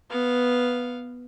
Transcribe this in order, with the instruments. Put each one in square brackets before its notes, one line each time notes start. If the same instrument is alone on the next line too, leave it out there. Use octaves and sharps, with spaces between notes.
[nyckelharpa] B3 F5